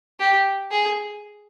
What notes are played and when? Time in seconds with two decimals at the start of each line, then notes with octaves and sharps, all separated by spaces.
0.20 G4
0.71 G#4